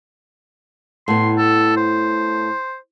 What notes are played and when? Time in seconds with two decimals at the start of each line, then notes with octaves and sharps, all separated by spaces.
1.08 A2 B3 C6
1.38 A4
1.77 C5